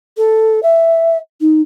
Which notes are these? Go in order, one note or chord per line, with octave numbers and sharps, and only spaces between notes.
A4
E5
D#4